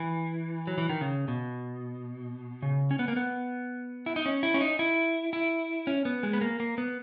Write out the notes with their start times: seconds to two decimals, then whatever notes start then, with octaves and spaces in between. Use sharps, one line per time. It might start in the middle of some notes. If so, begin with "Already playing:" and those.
Already playing: E3
0.67 F#3
0.78 E3
0.90 D#3
1.01 C#3
1.28 B2
2.62 C#3
2.91 C#4
2.99 B3
3.08 A#3
3.16 B3
4.06 E4
4.16 D#4
4.26 C#4
4.43 E4
4.54 C#4
4.61 D#4
4.79 E4
5.33 E4
5.87 C#4
6.05 B3
6.23 G#3
6.33 B3
6.41 A#3
6.60 A#3
6.78 B3